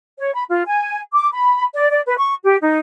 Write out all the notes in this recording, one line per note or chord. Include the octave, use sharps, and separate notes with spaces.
C#5
B5
F4
G#5
D6
B5
D5
D5
B4
C#6
G4
D#4